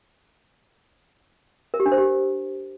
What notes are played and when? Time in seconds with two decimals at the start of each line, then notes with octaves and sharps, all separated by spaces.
1.74 A#4
1.80 G4
1.86 D4
1.92 C5
1.98 G4